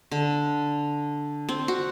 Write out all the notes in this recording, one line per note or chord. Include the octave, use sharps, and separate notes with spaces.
D3
C4
F#4